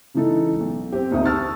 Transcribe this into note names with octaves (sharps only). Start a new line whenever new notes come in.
C#3 E3 G#3 D#4 A4
B1
C4 G4
G#1 D2 D#4 D#6
A5 C#6 E6 F6 A6